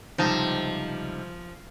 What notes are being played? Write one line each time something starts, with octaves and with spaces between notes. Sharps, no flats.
C#2 C3 F3 G3 D#4 A5